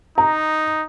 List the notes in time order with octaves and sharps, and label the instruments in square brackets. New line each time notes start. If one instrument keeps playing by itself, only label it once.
[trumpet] D#4 [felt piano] A#5